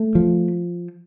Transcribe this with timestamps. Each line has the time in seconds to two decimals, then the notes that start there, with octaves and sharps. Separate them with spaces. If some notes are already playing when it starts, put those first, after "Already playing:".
Already playing: A3
0.15 F3